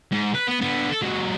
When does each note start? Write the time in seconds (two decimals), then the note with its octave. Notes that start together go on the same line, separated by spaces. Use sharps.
0.12 G#2
0.34 B4
0.47 B3
0.61 D3 B3
0.90 A4
1.03 F#3 G#3